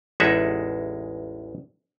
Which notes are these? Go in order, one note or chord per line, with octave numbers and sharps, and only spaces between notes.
A1 E2 G#3 D#4 E5 F#5